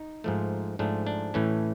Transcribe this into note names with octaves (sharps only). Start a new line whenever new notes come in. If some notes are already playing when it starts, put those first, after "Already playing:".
Already playing: D#4
G#2 F3 A3
G#2 F3 A3 D4
D4
A2 E3 A3 C#4